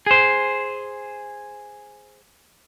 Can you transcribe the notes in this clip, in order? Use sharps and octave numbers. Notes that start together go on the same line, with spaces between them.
G#4 C5